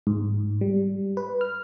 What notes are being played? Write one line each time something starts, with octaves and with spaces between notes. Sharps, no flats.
G#2
G3
B4
F6